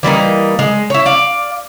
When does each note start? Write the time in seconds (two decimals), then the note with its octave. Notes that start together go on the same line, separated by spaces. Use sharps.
0.03 E3 G3 A#3 D#4
0.59 G#3
0.90 E4 C#5
1.06 D5 F5